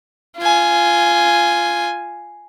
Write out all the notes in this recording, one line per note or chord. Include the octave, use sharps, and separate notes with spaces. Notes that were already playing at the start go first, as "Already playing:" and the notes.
F4 G#5